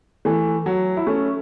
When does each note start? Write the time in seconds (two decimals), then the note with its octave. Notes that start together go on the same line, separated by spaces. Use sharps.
0.25 E3 A3
0.66 F#3
0.97 E4
1.06 A3 C#4